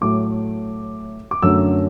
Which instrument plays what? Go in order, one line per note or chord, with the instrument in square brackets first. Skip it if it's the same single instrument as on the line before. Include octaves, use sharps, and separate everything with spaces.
[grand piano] A2 F#3 A3 D6
D6
F#2 D3 F#3 A3 E6